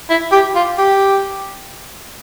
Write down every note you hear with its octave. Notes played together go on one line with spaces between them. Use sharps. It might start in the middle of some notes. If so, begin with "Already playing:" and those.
E4
G4
F4
G4